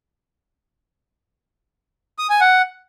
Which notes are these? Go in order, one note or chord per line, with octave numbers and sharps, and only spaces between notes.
D#6
G#5
F#5